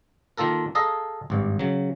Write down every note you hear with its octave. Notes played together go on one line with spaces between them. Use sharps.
D#3 A#3 F4 A4 A#4
G#4 A4 D#5 F5 A#5
G#1 G2
C#3 F#3